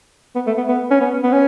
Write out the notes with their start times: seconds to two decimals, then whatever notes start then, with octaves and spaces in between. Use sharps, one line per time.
0.36 B3
0.47 A3
0.58 B3
0.68 B3
0.91 C#4
1.01 B3
1.23 B3
1.33 C#4